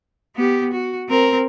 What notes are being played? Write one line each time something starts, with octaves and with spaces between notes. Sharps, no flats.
B3 G4
F#4
C4 A#4